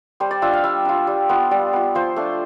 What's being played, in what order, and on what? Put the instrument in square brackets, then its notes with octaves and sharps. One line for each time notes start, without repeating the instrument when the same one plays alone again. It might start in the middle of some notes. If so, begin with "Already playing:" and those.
[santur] G3 C5
D5
D4 F4 E5
F5
G3 E5
D4 F4
G3
B3 F4
G3 D5
B3 F4
F3 C5
A3 D4